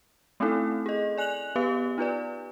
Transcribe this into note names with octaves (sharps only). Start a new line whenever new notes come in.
A3 C4 C#4 D#4 E4 A4
G#4 D#5
D5 G#5 F#6 F7 F#7
B3 G4 B4 F5
D#4 F4 B4 D5